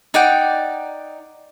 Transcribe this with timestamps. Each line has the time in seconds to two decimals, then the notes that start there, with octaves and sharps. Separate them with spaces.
0.14 D#4 D5 F#5 G5